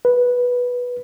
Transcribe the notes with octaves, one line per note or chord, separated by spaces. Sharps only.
B4